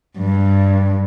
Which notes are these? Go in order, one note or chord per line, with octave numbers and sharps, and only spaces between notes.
G2